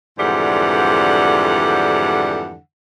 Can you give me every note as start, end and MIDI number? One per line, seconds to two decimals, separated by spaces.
0.19 2.57 41
0.19 2.57 44
0.19 2.57 50
0.19 2.57 52
0.19 2.57 55
0.19 2.57 78